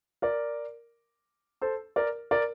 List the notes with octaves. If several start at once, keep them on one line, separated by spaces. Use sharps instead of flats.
A#4 D5
A4 C5
A#4 D5
A#4 D5